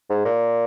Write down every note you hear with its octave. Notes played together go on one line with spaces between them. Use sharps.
G#2
A#2